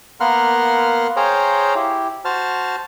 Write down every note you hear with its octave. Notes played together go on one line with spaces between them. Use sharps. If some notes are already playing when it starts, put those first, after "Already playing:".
A#3 B3 A#4 F#5 C6 F6
G#4 C5 C#5 F5 G5 A#5
E4 G4
F#4 C5 A5 F6